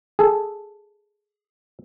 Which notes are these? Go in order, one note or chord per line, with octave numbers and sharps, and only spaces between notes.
G#4 A4